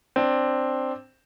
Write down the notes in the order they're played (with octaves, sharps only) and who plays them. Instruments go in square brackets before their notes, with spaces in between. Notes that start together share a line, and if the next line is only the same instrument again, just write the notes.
[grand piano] C4 D4